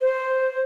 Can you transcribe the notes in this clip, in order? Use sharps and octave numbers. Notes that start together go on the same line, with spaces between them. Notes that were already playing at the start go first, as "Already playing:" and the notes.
C5